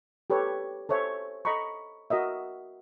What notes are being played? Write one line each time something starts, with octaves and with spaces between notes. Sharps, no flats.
G4 A4 B4 C#5
A4 C5 C#5 E5
A4 D#5 A#5 B5 C#6
F#4 A#4 D#5 E5